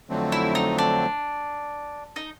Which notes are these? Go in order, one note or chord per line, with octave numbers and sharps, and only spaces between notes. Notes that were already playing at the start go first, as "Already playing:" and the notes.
F2 D3 F#3 A3 C4
E4
D#4
D4
D#4